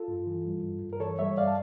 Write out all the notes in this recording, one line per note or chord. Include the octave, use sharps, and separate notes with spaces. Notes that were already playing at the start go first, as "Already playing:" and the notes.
Already playing: F4 A4
G2
E3
G3
G2
G2
A#4
E3 A4 C#5
G3 C#5 E5
G2 D5 F5
A5